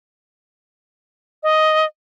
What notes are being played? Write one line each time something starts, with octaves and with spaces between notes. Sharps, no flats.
D#5